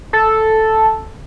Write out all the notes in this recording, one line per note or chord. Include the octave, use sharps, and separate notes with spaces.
A4